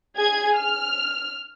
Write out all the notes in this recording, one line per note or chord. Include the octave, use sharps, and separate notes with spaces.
G#4 G#6
F6